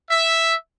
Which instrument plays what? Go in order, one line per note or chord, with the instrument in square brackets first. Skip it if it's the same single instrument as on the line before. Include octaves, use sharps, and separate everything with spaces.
[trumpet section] E5